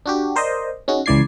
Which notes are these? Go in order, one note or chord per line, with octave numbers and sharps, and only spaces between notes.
D4 F#4 G4
A#4 C5 D5 D#5
C#4 D#4 F#4 G#4
C#2 C#3 E3 D5 G#6 C7